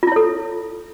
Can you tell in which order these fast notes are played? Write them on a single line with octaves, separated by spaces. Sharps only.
F4 E4 C#5 A4